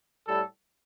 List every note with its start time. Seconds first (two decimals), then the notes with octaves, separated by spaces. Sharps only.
0.27 A2 G3 A4